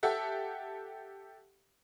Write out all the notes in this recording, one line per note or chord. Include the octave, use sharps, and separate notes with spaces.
G4 A4 E5 F#5